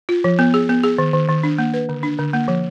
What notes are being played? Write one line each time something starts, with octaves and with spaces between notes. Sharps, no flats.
F4
F3
B3
G#4
B3
G#4
D#3
D#3
D#3
D4
A#3
B4
D3
D4
D3
A#3
F3